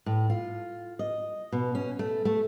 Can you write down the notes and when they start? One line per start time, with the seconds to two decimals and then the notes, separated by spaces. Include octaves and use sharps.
0.06 A2
0.30 F4
0.99 D#5
1.52 B2
1.75 C#4
1.99 A3
2.25 A3